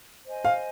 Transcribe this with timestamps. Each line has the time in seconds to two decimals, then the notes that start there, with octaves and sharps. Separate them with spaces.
0.24 C5 D#5 G#5
0.45 F5